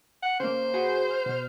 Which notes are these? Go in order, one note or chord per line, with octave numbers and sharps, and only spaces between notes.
F#5
C#3 A#3 C5
F#4 G#4 B4
F6
B2 F6